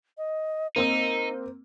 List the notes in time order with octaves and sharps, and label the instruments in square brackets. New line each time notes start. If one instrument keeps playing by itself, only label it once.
[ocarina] D#5
[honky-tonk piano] A#3 C4 E6 [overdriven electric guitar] D#4 [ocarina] C5